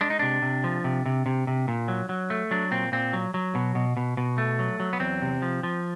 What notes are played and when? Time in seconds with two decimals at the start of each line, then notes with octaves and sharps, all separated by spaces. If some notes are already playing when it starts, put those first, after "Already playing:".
0.01 G#3 D4
0.10 D#4
0.19 C3 D4
0.42 C3
0.64 F3
0.84 C3
1.06 C3
1.26 C3
1.47 C3
1.68 A#2
1.88 F#3
2.09 F#3
2.30 A3
2.51 F#3 D4
2.71 A#2 C4
2.92 A#2 C4
3.13 F#3
3.34 F#3
3.55 B2
3.75 B2
3.97 B2
4.17 B2
4.38 A3
4.59 F#3
4.80 F#3
4.93 B3
5.00 E2 C4
5.22 C3
5.42 F3
5.63 F3